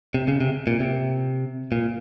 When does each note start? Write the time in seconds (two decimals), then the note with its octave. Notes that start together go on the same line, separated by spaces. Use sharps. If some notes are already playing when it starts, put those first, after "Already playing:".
0.14 C3
0.28 C#3
0.41 C3
0.67 A#2
0.80 C3
1.72 A#2